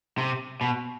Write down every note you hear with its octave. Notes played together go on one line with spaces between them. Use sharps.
C3
B2